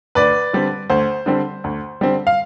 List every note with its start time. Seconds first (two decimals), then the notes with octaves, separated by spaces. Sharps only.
0.15 D2 B4 D5
0.53 D3 G3 C4
0.90 D2 C5
1.26 D3 G3 C4
1.64 D2
2.01 D3 G3 C4
2.27 F5